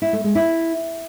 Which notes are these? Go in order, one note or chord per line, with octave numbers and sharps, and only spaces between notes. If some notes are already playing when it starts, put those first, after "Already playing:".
E4
A3
G#3
E4